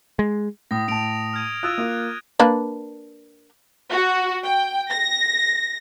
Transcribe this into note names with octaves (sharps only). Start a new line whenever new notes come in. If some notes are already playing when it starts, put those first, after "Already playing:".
G#3
A2 D#6 A#6
A2 A5 D7 F7
F6 G#6 D#7
F4 D#6 E6 F#6 A6 F7
A#3 F4
A#3 D4 B4
F#4
G5
A#6